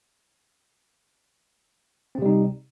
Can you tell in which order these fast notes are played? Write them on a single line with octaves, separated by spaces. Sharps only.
C4 C3 G3 D#4